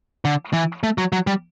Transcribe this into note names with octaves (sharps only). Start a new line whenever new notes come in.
D3
E3
A3
F#3
F#3
G3